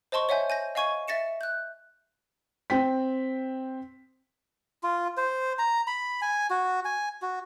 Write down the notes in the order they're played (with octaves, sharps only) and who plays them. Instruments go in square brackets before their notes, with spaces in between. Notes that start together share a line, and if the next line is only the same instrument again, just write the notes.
[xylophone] C5 D#5 A5 C6 C#6
C#5 E5 F#5 G#5 G6
G#5 G6 A#6
D#5 F5 G#5 C#6 G#6 D#7
E5 A6 A#6 C#7 E7
F#6 G6
[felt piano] C4 G5 B6
[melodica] F4
C5
A#5
B5
G#5
F#4
G#5
F#4